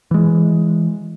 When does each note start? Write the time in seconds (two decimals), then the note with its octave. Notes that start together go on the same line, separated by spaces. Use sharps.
0.11 E3 G#3